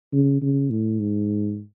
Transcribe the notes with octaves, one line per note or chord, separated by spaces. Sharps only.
C#3
C#3
A2
G#2